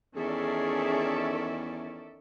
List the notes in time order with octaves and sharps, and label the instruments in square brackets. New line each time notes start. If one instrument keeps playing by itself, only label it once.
[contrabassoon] E2 [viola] D#3 C#4 [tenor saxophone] G#4 [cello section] A4 D5 E5